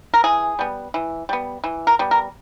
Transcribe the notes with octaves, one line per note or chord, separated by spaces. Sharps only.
A#4
E3 G#4
G3 B3
E3
G3 B3
E3
A#4
G3 B3
A#4